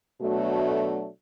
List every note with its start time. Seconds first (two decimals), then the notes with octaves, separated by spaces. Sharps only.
0.19 B2 F#3 A3 D4 F#4